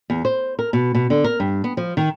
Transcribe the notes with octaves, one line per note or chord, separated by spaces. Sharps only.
E2
C5
A#4
B2
B2
D3
A#4
G2
B3
F3
D#3